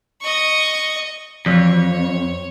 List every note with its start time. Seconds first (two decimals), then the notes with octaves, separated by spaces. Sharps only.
0.21 D#5 C#6
1.46 F2 E3 F3 C#5